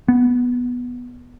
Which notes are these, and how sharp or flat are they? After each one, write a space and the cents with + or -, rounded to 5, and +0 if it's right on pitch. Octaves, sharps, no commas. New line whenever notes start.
B3 -5